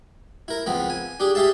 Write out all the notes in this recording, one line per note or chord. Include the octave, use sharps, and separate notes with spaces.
E4 A#4
C#2 F3 B3 C4
G#5
D4 G4 G#4
G4 G#4 E5 F5 A5